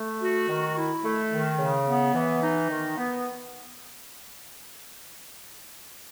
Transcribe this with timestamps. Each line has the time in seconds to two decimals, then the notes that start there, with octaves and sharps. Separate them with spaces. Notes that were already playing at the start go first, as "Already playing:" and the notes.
Already playing: A3
0.21 F#4
0.48 D#3
0.77 E4
1.04 A3
1.32 D#3
1.58 C#3
1.87 B3
2.14 E3
2.42 D#4
2.69 D#3
2.97 B3